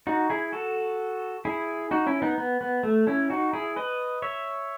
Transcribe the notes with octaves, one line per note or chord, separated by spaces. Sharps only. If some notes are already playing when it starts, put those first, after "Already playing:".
D#4 F#4
E4 G#4
F#4 A4
E4 G#4
D#4 F#4
C#4 E4
B3 D#4
B3
B3
A3
C#4 E4
D#4 F#4
E4 G#4
B4 D#5
C#5 E5